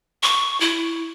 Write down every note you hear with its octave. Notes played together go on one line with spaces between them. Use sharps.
C#6
E4